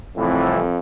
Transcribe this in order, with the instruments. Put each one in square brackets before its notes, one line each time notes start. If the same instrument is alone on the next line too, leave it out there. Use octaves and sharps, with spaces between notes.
[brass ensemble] C2 A2 E3 [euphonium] F2